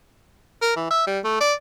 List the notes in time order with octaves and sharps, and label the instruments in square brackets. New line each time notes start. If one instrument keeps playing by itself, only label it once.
[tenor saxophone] A#4
E3
E5
G3
A3
D5